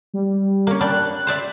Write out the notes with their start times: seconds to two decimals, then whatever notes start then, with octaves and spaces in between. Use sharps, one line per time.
0.14 G3
0.67 A#3 C#4
0.81 G3 D4 F#6
1.27 C5 D5 E5